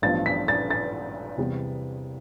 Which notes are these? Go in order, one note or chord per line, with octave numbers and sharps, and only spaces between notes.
A1 G2 F3 B3 A6
B6
A6
A6
E2 C3 G3 B3